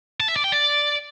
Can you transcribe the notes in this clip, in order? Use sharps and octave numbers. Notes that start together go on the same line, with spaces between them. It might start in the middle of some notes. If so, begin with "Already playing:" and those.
A5
E5
D5
G5
D5